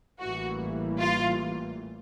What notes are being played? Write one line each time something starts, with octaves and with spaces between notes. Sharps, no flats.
A1 A2 E3 G3 A#3 F#4
F4